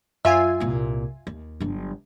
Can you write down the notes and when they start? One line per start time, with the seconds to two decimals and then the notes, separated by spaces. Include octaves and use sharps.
0.25 F#2 F4 E5 G#5
0.60 C2 A#2
1.27 D#2
1.60 G1 F#3